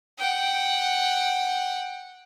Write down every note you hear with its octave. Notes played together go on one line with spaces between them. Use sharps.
F#5 G5